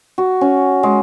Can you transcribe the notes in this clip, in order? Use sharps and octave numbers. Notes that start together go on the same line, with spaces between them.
F#4
C#4
G#3